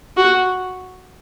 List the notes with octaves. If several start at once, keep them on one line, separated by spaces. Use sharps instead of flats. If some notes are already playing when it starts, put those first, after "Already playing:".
F#4